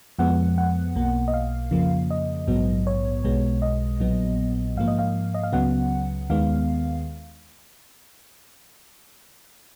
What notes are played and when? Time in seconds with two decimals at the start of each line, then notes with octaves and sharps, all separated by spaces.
0.19 F2 F3 G#3 B3 F#5
0.58 F#5
0.95 B1 B2 A#3
1.28 D#5
1.34 F5
1.71 F2 C#3 F3 A#3
2.10 D#5
2.47 A#1 G#2 F#3 B3
2.87 C#5
3.24 B1 B2 G#3 B3
3.62 D#5
4.00 A#1 A#2 F#3 B3
4.77 G#2 F3 A#3 F5
4.88 D#5
4.99 F5
5.34 D#5
5.43 F5
5.53 C#2 C#3 F#3 B3 F#5
6.30 D#2 D#3 G#3 B3 F5